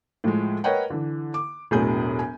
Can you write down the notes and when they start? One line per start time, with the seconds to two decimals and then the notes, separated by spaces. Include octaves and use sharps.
0.24 A2 F3 G#3
0.64 A#4 B4 C#5 D#5 F#5 G5
0.90 D3 E3
1.34 D6
1.71 E1 A2 F#3 G#4 G6
2.19 G#5